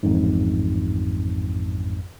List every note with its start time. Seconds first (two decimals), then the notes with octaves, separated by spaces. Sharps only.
0.03 A1 F2 G#2